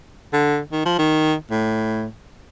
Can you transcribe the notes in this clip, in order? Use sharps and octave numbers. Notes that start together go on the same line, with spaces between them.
D3
D#3
F3
D#3
A2